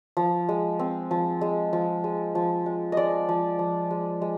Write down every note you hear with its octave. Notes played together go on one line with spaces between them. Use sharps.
F3
G#3
C4
F3
G#3
F3
G#3
F3
G#3
G#3 D5 D#5
F3
F3
G#3
G#3